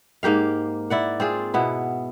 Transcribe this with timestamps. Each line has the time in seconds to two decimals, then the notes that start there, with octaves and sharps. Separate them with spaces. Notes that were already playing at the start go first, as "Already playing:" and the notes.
0.23 G#2 A#3 G4 F5
0.90 E4 D5 F#5
1.20 C4 F4 G#4
1.54 B2 B3 E4